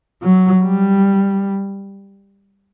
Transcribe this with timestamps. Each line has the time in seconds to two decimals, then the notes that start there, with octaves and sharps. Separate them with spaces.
0.22 F#3
0.63 G3